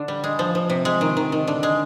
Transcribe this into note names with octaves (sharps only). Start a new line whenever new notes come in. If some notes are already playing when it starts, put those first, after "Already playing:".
Already playing: D3 D4
G3
G#3
F3
F3
C3
G#3
D#3
D#3
D#3
D3
G#3